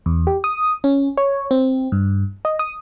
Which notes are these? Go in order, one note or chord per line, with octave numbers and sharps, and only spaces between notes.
E2
G4
D#6
C#4
C#5
C4
G2
D#5
D#6